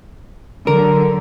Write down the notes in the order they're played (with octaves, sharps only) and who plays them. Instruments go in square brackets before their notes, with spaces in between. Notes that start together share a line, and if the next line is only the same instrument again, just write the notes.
[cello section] D3 F#3 [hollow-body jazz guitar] A#4